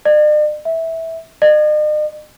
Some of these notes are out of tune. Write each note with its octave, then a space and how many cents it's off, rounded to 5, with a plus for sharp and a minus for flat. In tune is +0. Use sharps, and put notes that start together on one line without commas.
D5 +45
E5 -15
D#5 -45